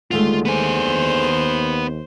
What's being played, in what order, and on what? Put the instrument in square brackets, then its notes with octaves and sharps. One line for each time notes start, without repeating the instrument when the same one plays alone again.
[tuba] D#2 [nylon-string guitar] D3 G#3 A3 [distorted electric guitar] F4
[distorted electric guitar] B3 G#5 [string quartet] C5